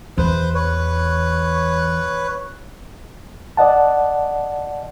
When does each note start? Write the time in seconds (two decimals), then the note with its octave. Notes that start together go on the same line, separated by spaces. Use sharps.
0.18 E2 B4 C5
0.55 B4 C#5
3.57 D5 D#5 F#5 A5